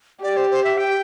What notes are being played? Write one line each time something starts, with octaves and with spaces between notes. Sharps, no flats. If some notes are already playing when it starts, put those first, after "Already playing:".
G4 D5
C5
C5
E5
G5